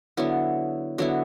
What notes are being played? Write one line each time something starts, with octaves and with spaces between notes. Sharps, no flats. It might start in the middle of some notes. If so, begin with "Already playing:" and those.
D3 F#3 B3 E4
D3 F#3 B3 E4